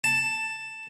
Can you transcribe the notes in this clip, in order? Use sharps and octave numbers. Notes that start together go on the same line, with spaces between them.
A5